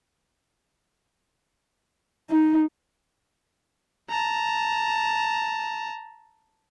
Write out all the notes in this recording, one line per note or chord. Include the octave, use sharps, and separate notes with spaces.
D#4
A5 A#5